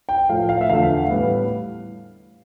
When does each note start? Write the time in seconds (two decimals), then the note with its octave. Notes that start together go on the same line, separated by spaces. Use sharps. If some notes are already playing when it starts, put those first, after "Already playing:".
0.09 G5
0.29 A2 F3 A3 F5
0.49 F5
0.61 E5
0.70 E2 D3 F3 A3 F5
1.10 A2 G3 B3